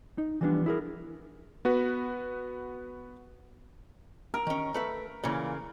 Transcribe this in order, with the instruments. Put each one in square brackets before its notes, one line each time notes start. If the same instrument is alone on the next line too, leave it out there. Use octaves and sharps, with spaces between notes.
[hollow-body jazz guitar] D#4
E3 F3 G3 B3 C#4 D4
E4 G#4 A#4
[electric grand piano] B3 F#4 B4
[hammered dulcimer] A#4
[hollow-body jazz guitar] D#3 C#4
A3 B4 E5
[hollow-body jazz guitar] A#2 E3 [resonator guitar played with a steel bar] C#3 A#3